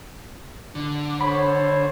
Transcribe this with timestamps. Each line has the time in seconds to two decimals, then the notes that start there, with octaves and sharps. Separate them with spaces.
0.75 D3
1.21 A4 C5 C#5 B5